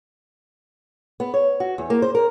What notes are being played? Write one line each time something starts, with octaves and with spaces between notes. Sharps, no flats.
B3
C#5
F#4
E2
A#3
C5
A#4